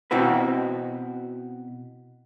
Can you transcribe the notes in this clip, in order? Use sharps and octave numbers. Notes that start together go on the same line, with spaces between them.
B2 C4 E4 F#4 B4